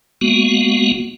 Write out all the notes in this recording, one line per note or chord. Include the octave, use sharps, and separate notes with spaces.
G#3 A#3 B3 F#4